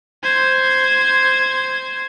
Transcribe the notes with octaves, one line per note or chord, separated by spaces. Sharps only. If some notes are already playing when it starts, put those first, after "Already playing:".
C5 G#6